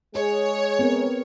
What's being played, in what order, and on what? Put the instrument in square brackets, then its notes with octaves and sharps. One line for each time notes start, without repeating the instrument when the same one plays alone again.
[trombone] G#3 [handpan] G#4 [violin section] C#5
[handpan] B3 C4 A#4